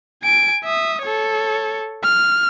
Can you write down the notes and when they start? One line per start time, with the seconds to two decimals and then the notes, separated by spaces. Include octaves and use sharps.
0.23 G#5 D7
0.64 E5 D#6
1.03 A4 C#5
2.03 F6